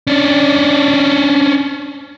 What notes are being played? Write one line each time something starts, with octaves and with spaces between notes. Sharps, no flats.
C#4 D4